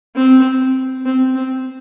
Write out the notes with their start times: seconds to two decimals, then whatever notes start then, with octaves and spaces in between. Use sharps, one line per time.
0.16 C4
1.06 C4
1.35 C4